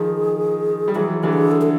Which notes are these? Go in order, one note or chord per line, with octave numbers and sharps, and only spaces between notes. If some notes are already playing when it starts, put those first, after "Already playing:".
Already playing: D#3 F3 G#4
G3
E3 F#3 G#4
D3 E3 G4
G#4
A4
A4